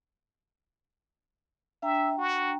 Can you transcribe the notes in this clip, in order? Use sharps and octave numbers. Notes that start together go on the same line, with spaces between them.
D4 E5 G5 A#5
F#4